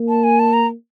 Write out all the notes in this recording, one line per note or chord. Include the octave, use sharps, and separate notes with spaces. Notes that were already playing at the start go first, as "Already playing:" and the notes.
Already playing: A#3
A5
G#5
A5
A#5